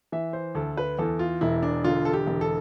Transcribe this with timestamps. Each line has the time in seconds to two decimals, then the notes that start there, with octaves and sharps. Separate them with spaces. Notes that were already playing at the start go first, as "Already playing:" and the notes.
0.12 E3 E5
0.33 C5
0.55 D2 A4
0.77 B4
0.99 E2 A4
1.19 F4
1.41 E1 E4
1.63 D4
1.84 D3 F4
2.05 A4
2.13 G4
2.27 E1
2.41 A4